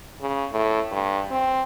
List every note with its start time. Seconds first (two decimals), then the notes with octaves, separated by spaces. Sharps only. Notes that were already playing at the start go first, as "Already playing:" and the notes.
0.21 C#3
0.52 A2
0.92 G2
1.31 C4